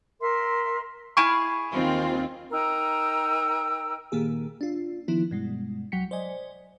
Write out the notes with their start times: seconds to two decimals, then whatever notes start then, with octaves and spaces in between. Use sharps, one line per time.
0.20 A#4 E5 C6
1.17 E4 G#4 F5 C#6
1.72 D#2 C4 F4
2.51 D#4 A#4 G5 E6
4.12 A#2 D#3 A#3 G4 G#4
4.61 D4 F4
5.08 D#3 F3 B3 E4
5.31 G2 B2 G#3
5.92 B1 F#3 F#5 G5 B6 C#7
6.11 C5 D5 D#5 G#5